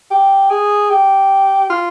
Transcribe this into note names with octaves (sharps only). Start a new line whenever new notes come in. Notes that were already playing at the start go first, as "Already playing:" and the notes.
G4
G#4
G4
F4